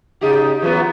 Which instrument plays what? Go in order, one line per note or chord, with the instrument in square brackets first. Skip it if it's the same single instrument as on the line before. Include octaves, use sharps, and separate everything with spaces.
[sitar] C#3 D#4 G4 [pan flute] G#4
[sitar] E3 F#3 B3 [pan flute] F4